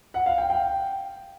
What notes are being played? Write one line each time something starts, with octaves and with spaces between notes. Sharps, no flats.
F#5
F5
G5
G5